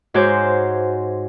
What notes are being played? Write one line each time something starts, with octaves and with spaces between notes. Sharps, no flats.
G#2 F#4 C5 C#5 D6 G6